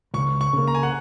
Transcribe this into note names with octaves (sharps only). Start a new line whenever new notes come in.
C#2 C#6
C#6
C#3 A#3
A#5
G#5
F#5